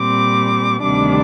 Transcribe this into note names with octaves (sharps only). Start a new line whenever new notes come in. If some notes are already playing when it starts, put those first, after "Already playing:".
Already playing: A#2 G3 C4 D6
D2 C3 D#3 G3 D4 D6